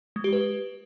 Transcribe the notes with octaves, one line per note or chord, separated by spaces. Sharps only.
G#3
G4
B4